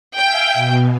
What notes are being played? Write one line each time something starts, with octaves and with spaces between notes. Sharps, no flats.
E5 F5 G5 G#5
B2